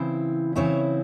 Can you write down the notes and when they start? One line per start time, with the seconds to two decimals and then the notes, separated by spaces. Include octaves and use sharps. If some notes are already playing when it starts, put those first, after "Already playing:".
Already playing: C#3 E3 C4 E4
0.56 C#3 E3 C4 E4 C#5 E5